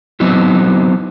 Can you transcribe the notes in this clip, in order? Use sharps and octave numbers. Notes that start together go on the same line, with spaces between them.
F#3 B3 C4 D#4 E4 F#4